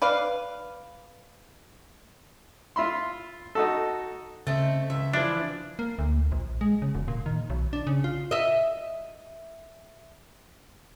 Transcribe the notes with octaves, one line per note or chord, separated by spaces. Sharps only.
B4 D5 F5
F4 E5 B5 C6
D#4 F#4 A4
C#3 A3 C4 D#5 A6
C#2 E5
E3 F3 D4 E4
A#3
D2
A#1
G#3
C#3
E1
A#2
D#3
B1
D4
C#3
F4
D#5 E5